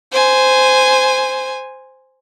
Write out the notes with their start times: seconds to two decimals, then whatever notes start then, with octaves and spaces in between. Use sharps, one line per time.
0.12 C5 G#5